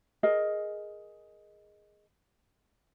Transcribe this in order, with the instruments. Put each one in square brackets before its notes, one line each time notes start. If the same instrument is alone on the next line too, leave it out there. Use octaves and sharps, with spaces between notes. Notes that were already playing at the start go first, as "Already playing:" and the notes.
[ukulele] G#4 A#4 D#5